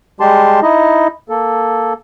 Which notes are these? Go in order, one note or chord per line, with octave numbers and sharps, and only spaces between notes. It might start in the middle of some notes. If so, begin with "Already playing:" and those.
G3 G#3 G4 A5 C6
D#4 E4 D#5
A#3 A4